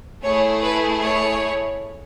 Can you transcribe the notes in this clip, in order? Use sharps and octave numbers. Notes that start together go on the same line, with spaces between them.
A3 E4 G#4 C#5
B4
C#5